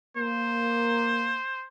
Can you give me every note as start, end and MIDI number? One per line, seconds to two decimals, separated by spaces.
0.17 1.38 58
0.17 1.67 72